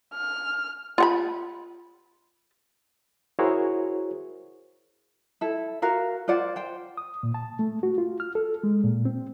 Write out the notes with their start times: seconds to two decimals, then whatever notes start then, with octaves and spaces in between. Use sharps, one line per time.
0.14 F6
0.98 F4 F#5 B5
3.39 E4 F#4 G#4 A#4 C5 C#5
5.41 E4 A4
5.82 F#4 A#4 F5
6.28 F4 C5 D5 F#5
6.56 C5 G5
6.97 D#6
7.23 A#2
7.34 A5
7.59 A3
7.83 F#4
7.98 F4
8.20 F6
8.35 A4
8.64 G#3
8.84 A#2
9.05 C4